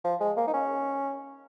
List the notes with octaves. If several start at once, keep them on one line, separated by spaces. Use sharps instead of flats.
F3
G#3
A#3
D#4
C#4